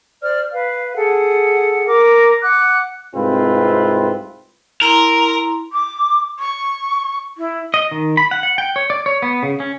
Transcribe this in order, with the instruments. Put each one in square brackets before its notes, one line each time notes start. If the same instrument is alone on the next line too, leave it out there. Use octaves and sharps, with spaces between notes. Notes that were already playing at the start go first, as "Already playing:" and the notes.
[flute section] C5 D5 F6
B4 F5
G#4 A4 F#5
A#4 D6
F#5 D6 F#6
[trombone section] C2 G#2 C4 F4 B4
[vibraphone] E4 A#5 C6 [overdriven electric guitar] A#4
[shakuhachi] D6
C#6
E4
[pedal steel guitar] D#5
D#3
B5
F#5
F#5
G5
C#5
D5
C#5
B3
C#3
C#4